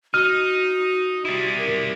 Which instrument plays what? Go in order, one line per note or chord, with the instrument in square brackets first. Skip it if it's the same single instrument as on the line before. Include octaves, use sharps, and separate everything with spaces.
[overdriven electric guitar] D#4 [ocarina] F#4 [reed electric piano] F6
[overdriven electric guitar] G3 E4
[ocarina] A#4